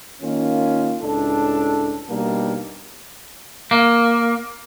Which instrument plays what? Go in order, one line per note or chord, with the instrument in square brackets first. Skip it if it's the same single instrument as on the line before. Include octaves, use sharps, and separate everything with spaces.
[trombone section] D#3 A#3 C#4 F4
C#2 A2 D4 A4
B2 G3 A#3 D4 D#4
[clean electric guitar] A#3